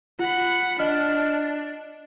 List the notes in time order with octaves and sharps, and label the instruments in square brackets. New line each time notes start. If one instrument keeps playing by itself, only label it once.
[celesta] F4 [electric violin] F#5 B5
[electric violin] D4 [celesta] D#5 F6